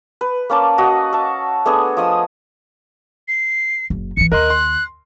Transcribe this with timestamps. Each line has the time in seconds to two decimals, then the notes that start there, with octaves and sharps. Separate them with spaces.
0.21 B4
0.50 A#3 C#4 D5 A5
0.78 F#4 D#5 F#5
1.13 E5 A5
1.66 A3 B3 D4 G#4
1.97 F3 D#5 D#6 E6
3.28 C7
3.90 F#1
4.17 D3 E3 C#7
4.32 D#2 A#4 D#5 C6 F#6
4.50 C6